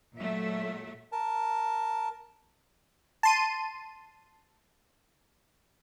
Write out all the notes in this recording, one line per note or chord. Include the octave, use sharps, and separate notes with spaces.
A#2 F#3 A3 E5
A#4 A5
A5 C6 D#7